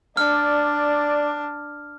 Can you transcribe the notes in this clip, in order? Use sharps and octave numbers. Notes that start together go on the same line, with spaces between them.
D4 D5 F6